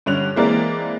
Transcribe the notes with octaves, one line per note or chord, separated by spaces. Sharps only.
G2 D3 C#4 F#6 F7
E3 G#3 A#3 C4 A#4 D5